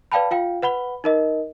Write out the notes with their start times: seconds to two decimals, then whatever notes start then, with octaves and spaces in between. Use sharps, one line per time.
0.12 B4 D5 F5 G5 A5 B5
0.31 F4 F5 G5
0.62 B4 F#5 B5 G7
1.04 D#4 A#4 D#5